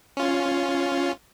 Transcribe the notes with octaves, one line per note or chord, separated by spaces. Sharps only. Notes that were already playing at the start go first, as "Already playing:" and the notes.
C#4 F4